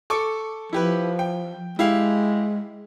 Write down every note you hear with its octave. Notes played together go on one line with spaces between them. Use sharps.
A4 C#6 D6
F3 E4 G4 B4
G5
G#3 E4 G4 F5